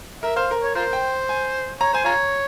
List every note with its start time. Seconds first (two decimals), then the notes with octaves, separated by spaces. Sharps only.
0.23 A#4 E5
0.36 C5 F5
0.51 A#4
0.63 C#5
0.75 F4 A#4 C5
0.93 G5
1.29 G#5
1.81 C#5 A#5
1.93 C5 G#5
2.05 F4 C#5 A#5